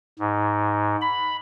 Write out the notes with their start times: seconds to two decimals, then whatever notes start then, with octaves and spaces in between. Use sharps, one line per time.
0.19 G#2
1.01 B5